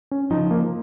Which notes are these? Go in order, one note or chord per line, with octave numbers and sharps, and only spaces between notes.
C#4
C#3 F3 D#4
A#3